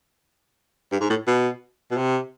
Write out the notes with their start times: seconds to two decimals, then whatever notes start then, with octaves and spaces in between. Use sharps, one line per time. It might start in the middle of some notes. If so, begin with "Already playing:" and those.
0.92 G2
1.01 G#2
1.10 A2
1.27 B2
1.91 B2
1.97 C3